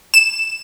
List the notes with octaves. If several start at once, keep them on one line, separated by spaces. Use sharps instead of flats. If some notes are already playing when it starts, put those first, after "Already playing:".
E7